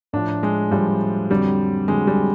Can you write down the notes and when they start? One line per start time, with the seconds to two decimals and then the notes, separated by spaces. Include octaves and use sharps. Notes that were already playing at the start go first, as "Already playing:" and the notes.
0.13 A2 F3 D4
0.43 G#3
0.71 A2 F3 G3
1.30 F2 D3 F#3 G3
1.88 F2 D3 F#3 G#3
2.07 G3